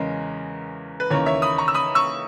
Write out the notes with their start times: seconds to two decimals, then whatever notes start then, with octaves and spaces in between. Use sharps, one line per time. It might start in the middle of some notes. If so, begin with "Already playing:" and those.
Already playing: E2 C#3 G#3 C#4 A#4
1.00 B4
1.10 D#2 C#3 E3 A#3 A#4 C#5
1.26 C#5 E5
1.42 B5 D#6
1.58 A#5 C#6
1.68 E6
1.74 B5 D#6
1.95 C#6 E6